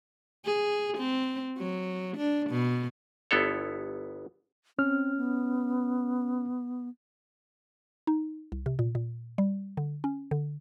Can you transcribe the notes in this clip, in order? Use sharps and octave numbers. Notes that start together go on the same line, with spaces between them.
G#4
C4
F#3
D4
B2
G1 B3 E4 A4 C#5
C4 C#4 F6
B3
D#4
C2
C3
A#2
A#2
G3
D3
C#4
D3